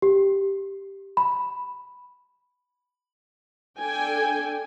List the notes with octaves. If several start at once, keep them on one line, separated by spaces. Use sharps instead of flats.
G4
B5
D4 A4 G5 G#5